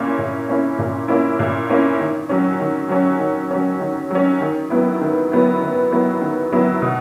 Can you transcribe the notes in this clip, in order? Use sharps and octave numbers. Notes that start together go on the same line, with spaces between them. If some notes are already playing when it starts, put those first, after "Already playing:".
Already playing: A#2 A#3 C#4 E4
A#2
A#3 C#4 E4
A#2
A#3 C#4 E4
A#2
A#3 C#4 E4
D#3
F#3 C#4
D#3
F#3 C#4
D#3
F#3 C#4
D#3
F#3 C#4
D#3
F#3 B3 E4
D#3
F#3 B3 E4
D#3
F#3 B3 E4
D#3
F#3 B3 E4
B2